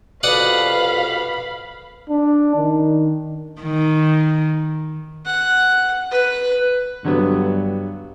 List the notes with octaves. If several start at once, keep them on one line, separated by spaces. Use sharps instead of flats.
C2 F2 B2 D5 F5 F#5 B5 D#6
D4
D#3
D#3
F#5
B4
G2 D3 F#3 B3